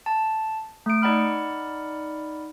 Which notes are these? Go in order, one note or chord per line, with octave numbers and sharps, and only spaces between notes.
A5
A3 D7
D#4 D5 F#5 B5 F6